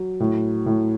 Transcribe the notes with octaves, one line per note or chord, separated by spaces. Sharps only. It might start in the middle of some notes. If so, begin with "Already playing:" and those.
Already playing: F#3
A2
A2